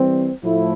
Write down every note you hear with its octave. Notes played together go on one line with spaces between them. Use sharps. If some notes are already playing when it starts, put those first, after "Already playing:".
Already playing: E3 G3 C4
A2 F3 A3 E4